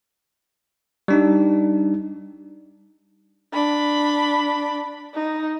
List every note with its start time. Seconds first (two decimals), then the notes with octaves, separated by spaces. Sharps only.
1.08 G3 D4 D#4
3.53 D4 B5
5.14 D#4